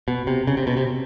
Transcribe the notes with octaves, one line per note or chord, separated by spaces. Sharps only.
B2
C3
C#3
C3
B2
C3